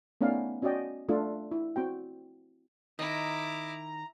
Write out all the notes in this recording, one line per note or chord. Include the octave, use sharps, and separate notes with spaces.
A3 B3 C#4 D#4 D5 F5
C#4 F#4 D5 D#5 G5
A3 D4 F4 A4
E4
C4 F#4 G5
D#3 E4 D#5 A#5 D6